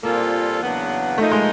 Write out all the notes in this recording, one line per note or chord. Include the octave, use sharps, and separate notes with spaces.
A#2 G3 A#3 C4 F4 A4
E2 C#3 F#3 B3 D4
F3 A3 A#3 D#4
G#3